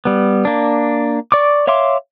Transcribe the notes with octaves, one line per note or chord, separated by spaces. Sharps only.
G3 B3
A#3 D4
D5 C#6 D6
C#5 E5 F5 C6 D6